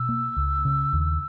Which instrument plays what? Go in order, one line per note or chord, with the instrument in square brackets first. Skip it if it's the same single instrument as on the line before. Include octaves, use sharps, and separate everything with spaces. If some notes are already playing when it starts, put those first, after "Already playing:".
Already playing: [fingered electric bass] B2 [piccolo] E6
[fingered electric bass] A#3
C#2
C#3
D#2